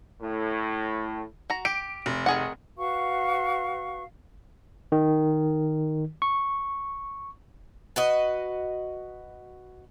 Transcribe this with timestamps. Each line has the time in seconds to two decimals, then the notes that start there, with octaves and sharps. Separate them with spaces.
0.22 A2
1.50 F#4 A#5
1.65 G4 D7
2.06 F1
2.26 D#3 G#4 F#5
2.77 F#4 B4 F5 C#6
4.92 D#3
6.22 C#6
7.96 F#4 B4 D#5